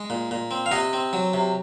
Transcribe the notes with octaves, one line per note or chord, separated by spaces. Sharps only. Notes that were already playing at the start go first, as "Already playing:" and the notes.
Already playing: G#3
A#2
A#2
C4
F5
C3 D#5 F#5
C4
F#3
C3